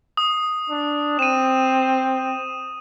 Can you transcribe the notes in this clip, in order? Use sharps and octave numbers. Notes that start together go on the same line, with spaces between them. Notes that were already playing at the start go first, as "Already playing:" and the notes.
D#6
D4
C4 D#7 E7